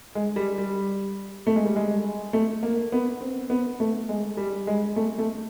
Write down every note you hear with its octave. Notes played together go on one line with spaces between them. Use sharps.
G#3
G3
G3
A3
G#3
G3
G#3
A3
A#3
B3
C4
B3
A3
G#3
G3
G#3
A3
A3